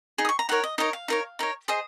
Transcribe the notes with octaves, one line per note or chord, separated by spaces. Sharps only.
D#4 G#4
D#6
C#6
A#5
D#4 A#4 C#5 F#5
D#5
D#4 A#4 C#5 D#5
F5
D#4 A#4 C#5
D#4 A#4 C#5
G#4 C5 D#5 D#6